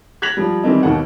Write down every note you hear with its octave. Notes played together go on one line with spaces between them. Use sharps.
F#6 G#6 A#6 B6 F7 F#7
F3 G3
D#3 E3 G3 C4 D#4
D#2 B2 D#3 F#5